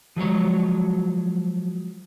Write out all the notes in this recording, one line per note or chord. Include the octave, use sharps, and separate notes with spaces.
F3 F#3 G#3 C#5